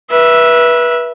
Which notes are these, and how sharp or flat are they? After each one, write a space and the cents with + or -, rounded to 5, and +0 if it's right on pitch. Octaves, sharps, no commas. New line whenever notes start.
B4 -25 E5 +0